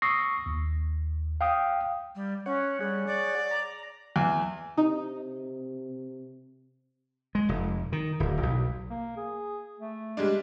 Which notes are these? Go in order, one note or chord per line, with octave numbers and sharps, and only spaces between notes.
C#6 D#6 E6 A#6 C7
D#2
F5 G5 D#6
G3
C#4 C#5 F#5
G3 G#4 C#5 F#5
D5
A#5
E2
C3 D#4
G#3
F1
D#3
D1
B1
A#3
G#4
A3
G3 G#3 D4